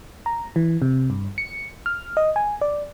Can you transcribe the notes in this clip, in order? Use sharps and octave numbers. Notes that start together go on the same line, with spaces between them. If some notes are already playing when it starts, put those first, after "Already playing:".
A#5
E3
C3
G2
C#7
F6
D#5
G#5
D5